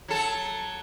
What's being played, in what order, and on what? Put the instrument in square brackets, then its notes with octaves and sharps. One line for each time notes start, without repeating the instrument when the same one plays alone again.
[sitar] F#3 A4